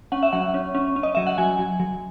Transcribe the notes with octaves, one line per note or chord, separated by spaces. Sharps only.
C#4 F#5
E5
F#3 F#5
C#4
C#4
C#4
D#5
F#3 E5
F#5
F#3 G#5
F#3
F#3